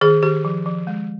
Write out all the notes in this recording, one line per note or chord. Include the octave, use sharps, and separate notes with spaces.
D#3 G#4
D#3 G4
F3
F3
G#3